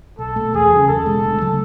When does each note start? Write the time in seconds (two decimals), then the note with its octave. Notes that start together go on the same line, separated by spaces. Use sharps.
0.19 B1 A4
0.36 B2 A3
0.54 E2 G#4
0.72 C#3 F#3
0.88 E2 A4
1.06 B2 G#3
1.24 D2
1.40 C#3 F#3 A3